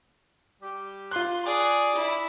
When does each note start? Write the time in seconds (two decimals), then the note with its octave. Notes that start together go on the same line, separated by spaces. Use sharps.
0.62 G3 G4
1.11 F4 C6 F#6
1.46 G#4 D5
1.95 E4